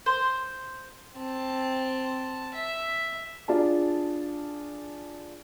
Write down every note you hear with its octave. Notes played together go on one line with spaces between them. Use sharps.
C5
C4 A5
E5
D4 F4 G#4 A5